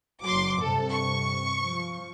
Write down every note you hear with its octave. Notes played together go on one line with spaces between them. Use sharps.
F#1 F#3 C6 D6
G2 C3 A4
C#6
F3